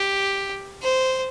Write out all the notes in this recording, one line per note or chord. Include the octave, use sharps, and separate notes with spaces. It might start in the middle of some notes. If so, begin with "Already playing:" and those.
Already playing: G4
C5